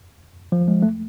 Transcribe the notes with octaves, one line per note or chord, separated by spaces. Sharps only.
F3
G#3
A3